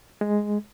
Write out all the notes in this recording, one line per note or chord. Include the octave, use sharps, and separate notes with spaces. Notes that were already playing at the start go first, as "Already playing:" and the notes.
G#3